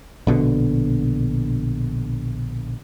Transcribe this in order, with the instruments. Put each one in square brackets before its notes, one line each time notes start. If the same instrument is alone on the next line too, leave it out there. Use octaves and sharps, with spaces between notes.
[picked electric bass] A#1 B2 D3